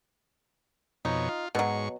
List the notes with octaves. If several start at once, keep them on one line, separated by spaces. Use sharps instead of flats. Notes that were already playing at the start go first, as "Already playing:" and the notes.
F2 B2 D#4 C#5
F4
G#2 B2 F#3 C#6